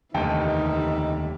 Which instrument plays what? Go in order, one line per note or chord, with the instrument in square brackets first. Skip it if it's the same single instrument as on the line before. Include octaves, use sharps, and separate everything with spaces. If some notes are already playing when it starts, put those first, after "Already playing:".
[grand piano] F1 G5 A5 [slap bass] D#2 D3 [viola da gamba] E3 G3 [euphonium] D#4